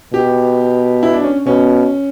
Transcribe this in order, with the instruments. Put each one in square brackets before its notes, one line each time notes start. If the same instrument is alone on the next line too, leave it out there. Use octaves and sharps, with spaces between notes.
[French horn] B2 [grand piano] G4
[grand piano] E4
D4
C#4
[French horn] B2 [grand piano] C#4